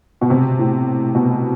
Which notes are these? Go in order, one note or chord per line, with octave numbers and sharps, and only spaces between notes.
B2
C3
A2
B2